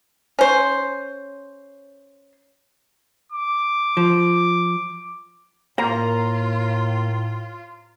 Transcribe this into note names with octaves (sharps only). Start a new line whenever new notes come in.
C#4 C5
D6
F3
A2 A#3 F4 A#5